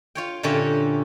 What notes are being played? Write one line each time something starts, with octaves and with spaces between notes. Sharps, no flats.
F4 C#5 G5
A#2 D3 C#4 G4 E5